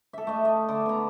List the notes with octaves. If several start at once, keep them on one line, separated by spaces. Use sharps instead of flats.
A4 E5
A3 D#5
D#5
D3
B3 A#5